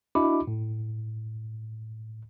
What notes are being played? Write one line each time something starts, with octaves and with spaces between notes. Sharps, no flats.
D4 E4 F#4 D#5 B5 D6
A2